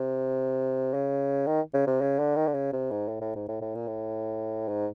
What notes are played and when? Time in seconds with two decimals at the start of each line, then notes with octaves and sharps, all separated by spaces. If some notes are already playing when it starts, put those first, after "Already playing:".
Already playing: C3
0.94 C#3
1.47 D#3
1.74 C#3
1.87 C3
2.01 C#3
2.19 D3
2.36 D#3
2.47 D3
2.54 C#3
2.73 C3
2.91 G#2
3.08 A2
3.21 A2
3.35 G#2
3.48 A2
3.61 A2
3.75 A#2
3.87 A2
4.68 G#2